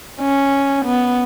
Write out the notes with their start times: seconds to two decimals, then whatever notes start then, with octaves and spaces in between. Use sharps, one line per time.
0.21 C#4
0.85 B3